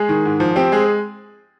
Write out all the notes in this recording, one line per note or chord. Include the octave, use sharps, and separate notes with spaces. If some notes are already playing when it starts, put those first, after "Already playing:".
Already playing: G#3 G#4
D#3
G#2
F3
C4 G4
G#3 G#4